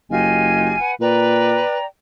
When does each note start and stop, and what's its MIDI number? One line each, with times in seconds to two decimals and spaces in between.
0.10 0.73 30
0.10 0.77 65
0.10 0.77 67
0.10 0.77 75
0.10 0.91 80
0.79 0.94 71
0.79 0.94 78
1.00 1.60 46
1.00 1.77 71
1.00 1.84 74
1.00 1.84 79
1.00 1.84 82